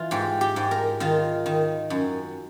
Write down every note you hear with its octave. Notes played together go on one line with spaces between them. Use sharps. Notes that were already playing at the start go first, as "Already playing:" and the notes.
Already playing: E3 F4
G#2 G4
G4
G#2
A#4
D#3 F4
D#3
F#2